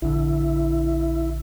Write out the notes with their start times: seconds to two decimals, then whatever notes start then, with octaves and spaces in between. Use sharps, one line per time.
0.02 A#1 D3 E4